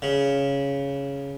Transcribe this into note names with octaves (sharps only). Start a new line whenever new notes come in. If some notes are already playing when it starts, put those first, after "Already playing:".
C#3